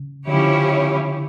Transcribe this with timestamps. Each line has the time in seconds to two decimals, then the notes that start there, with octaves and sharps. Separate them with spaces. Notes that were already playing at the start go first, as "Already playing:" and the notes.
Already playing: C#3
0.27 D3 F3 C#4 E4 G4 C#5